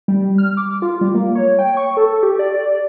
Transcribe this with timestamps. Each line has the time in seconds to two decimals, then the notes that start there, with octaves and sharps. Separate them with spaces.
0.08 G3
0.38 F6
0.57 D6
0.82 F4
1.01 G3
1.15 A#3
1.35 C#5
1.59 G5
1.77 C#6
1.97 A4
2.23 G4
2.39 D5